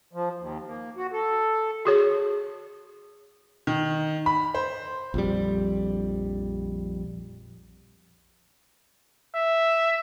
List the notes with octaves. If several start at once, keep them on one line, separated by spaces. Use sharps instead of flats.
F3
D#2
A#3
F#4
A4
F#4 G#4 C#5
D#3
B5
C5
A#1 F2 G3
E5